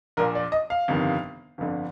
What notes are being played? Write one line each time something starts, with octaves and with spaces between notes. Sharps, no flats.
A#1 A#2 A#4
D5
D#5
F5
G1 F2 C3 D#3
G1 F2 D3